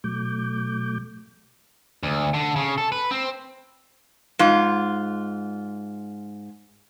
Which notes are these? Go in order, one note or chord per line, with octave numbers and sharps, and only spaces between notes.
B2 F#3 A3 D6 G6
D2
D3
C#3
A4
B4
C4
G#2 F4